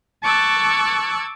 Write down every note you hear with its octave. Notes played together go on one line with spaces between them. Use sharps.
A5 C#6 D6 E6 F#6 G#6